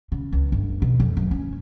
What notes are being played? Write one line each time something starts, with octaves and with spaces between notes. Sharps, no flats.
C#3
C#2
G1
B2
F2
F#1
C#4